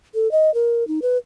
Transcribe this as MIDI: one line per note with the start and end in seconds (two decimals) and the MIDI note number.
0.14 0.30 69
0.31 0.53 75
0.54 0.86 70
0.88 0.99 63
1.02 1.17 71